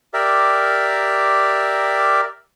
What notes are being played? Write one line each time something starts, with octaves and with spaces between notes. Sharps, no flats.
G4 A#4 D5 E5